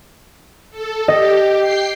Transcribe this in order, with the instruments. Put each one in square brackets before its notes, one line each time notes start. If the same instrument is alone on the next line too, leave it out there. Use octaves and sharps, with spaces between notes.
[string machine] A4
[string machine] G4 [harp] D#5
[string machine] G5 C7